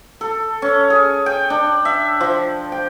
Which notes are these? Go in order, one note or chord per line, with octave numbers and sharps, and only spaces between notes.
A4
C#4
G#4
G5
D4
E5
F3
G5